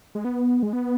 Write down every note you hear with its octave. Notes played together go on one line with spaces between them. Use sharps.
G#3
B3
G#3
B3